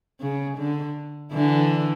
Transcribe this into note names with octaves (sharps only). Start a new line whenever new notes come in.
C#3
D3
D3 E3